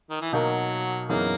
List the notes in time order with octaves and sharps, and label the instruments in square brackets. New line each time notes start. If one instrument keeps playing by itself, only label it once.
[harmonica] D#3
E3
[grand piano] B2 A#3 D#4 F#4 A#4 [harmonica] F#3
[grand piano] F#2 E3 B3 D#4 G#4 [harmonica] A#3